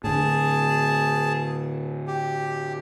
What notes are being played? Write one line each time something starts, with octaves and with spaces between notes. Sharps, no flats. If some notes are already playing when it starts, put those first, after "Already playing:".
A2 D3 G#4 A5
G4